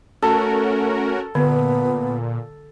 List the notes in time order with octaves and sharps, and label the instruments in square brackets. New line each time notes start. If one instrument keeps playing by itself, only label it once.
[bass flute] A3 [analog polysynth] C#4 F#4 A#4 [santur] A4
[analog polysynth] A#2 [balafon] D3 [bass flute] B3